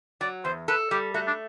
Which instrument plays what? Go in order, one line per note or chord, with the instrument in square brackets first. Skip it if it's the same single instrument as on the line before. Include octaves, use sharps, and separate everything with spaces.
[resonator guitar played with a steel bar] F#3 [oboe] D5
[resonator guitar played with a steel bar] E2 [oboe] C5
[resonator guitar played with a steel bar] A4 [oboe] B4
[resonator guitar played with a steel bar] G3 [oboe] G4
[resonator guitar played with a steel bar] A3 [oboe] F#4
[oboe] D4